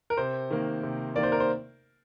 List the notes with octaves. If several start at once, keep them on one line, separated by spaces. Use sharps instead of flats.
A#4
C3 C5
D#3 A#3
C3
D#3 A#3 D5
C5
A#4
C5